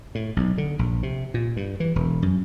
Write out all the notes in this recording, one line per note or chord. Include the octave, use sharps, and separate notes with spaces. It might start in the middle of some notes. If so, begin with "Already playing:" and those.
A2
B1
D3
A#1
C3
A#2
G2
E3
E1
F#2